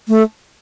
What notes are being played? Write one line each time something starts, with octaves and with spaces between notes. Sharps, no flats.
A3